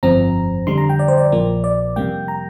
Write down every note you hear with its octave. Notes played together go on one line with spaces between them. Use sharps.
G1 F2 F3 C4 A#5
F2 D3 G3 C6
A#5
G5
D5
C5
D5
A#1 A#2 F3 A#3
D5
F2 C3 G3 A#3 G5
A#5